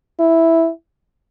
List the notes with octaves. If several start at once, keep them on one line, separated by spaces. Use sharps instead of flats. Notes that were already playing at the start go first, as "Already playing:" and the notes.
E4